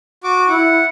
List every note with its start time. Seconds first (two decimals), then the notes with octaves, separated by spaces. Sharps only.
0.24 F#4 D6
0.49 E4 F#5